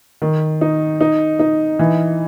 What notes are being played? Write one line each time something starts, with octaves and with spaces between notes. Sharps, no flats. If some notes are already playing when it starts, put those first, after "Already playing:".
D#3
D#4
D#4
D#4
E3